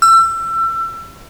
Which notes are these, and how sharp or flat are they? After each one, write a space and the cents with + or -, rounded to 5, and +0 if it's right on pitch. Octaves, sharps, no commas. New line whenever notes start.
E6 +30